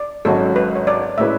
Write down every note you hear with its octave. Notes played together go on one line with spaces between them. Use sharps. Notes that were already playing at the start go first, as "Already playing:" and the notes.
Already playing: D5
G#1 G#2 F#3 C#4 F#4 A4
B4
C#5
D5
A2 G#3 C#4 E4 B4 E5